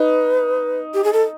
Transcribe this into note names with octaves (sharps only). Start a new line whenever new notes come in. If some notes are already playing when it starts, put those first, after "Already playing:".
Already playing: D#4 B4
G4
G#4
A4